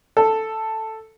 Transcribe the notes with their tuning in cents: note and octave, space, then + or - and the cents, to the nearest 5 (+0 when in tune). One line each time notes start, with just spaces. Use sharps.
A4 +5